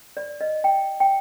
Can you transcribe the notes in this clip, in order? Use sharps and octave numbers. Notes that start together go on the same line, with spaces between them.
D5
D#5
G5
G5